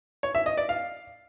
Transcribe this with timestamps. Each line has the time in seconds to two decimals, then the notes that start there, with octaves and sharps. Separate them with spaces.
0.23 C#5
0.35 E5
0.46 D#5
0.57 D5
0.69 F5